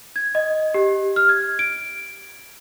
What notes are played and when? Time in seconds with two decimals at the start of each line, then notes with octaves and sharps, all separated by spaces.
0.16 G#6
0.35 D#5
0.74 G4
1.16 F6
1.29 G#6
1.59 D7